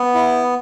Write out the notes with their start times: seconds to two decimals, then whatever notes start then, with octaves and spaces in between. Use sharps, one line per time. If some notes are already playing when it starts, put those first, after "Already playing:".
Already playing: B3
0.15 E4